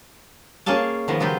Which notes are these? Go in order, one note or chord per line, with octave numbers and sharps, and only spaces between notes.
A#3 C#4 G#4 F5 A5
D#3 F3 B3
C#3 F#3 B3 F4 G4 C5